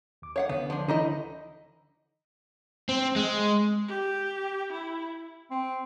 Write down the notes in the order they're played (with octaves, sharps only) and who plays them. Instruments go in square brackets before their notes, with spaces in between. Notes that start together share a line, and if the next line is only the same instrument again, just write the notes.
[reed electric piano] D#2 D6
[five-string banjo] C#5 F5 F#5
[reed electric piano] D2 D3 [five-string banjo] B3
[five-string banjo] F3 D4
[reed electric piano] D3 E3 [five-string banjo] D#4 E4 D#5
[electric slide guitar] C4
G#3
[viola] G4
E4
[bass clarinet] C4